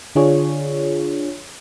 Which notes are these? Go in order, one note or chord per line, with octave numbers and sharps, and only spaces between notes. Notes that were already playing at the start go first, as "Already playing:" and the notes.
D3 D4 F4 G#4 C#5